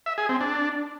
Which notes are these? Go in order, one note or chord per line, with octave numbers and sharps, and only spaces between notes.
E5
G#4
C4
D4